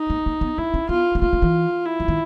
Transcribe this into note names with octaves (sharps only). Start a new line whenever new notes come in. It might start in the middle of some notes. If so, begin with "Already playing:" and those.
Already playing: D#4
A#3
A#3
B3
D4 E4
C#4
B3 F4
B3
A#3 F4
A#3
E3
E4
E3
D#3